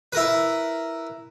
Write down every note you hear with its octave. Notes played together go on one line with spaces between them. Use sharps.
E4 A#4 B4